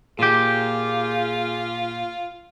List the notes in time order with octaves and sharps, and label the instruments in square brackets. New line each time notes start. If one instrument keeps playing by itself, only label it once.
[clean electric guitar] A#2 G4 [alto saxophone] F4 [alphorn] G#4